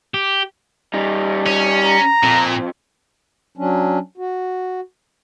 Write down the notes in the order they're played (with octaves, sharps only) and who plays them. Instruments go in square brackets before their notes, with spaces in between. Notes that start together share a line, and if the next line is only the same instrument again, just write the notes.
[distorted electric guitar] G4
[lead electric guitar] G3 D#4
[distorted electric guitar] C#4
[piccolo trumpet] A#5
[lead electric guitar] F2 [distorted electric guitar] A#2
[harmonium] F#3 C#4 D4
F#4